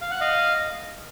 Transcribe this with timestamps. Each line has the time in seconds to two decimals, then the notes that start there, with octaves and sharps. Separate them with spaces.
0.01 F5
0.11 F#5
0.21 D#5 F5